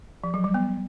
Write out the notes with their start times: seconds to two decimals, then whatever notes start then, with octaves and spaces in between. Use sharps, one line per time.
0.24 F3
0.34 F#3
0.44 G3
0.54 B3